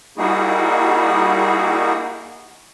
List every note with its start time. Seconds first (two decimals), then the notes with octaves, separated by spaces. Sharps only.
0.18 G3 A#3 D#4 E4 F#4 G#4